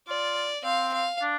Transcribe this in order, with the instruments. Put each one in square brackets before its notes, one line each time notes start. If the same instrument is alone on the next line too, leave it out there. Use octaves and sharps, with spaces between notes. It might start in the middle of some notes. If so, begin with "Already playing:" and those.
[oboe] F4 [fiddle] D5
[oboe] C4 [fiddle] F5
[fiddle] F5
[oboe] D4